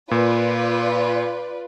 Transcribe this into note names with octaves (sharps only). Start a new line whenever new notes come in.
A#2 F4 B4 D5